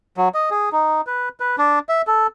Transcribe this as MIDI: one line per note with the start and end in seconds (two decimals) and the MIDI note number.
0.17 0.29 54
0.34 0.49 75
0.51 0.69 68
0.72 1.01 63
1.07 1.29 71
1.40 1.56 71
1.58 1.79 62
1.89 2.02 76
2.07 2.27 69